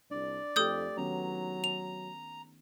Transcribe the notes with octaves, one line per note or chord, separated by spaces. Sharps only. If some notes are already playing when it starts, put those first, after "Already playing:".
C2 D4 D5
F2 A3 G4 A4 D#6 G6
D#3 F#3 B3 C#4 A#5
F7